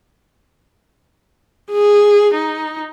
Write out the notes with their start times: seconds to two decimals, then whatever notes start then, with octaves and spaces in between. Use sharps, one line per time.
1.72 G#4
2.34 D#4